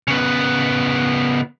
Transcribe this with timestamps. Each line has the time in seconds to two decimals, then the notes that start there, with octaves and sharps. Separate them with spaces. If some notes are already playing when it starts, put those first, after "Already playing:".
0.08 C#3 B3